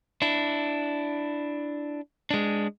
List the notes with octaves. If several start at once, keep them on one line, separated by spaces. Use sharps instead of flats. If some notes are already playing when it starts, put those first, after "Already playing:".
D4 E4
G#3 D4